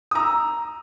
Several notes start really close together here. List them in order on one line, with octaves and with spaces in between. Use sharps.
D#6 A#5 E6